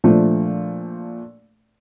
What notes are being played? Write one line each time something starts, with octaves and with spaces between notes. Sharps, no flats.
A#2 F3 A3 D4